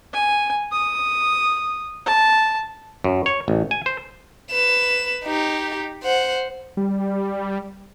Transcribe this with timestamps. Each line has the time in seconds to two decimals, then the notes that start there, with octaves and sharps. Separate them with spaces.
0.13 G#5
0.72 D#6
2.06 A5
3.04 F#2
3.26 C#5
3.48 A1
3.71 G#5
3.86 C5
4.51 B4 E7
5.24 D#4 G4
6.03 C5 F#5
6.77 G3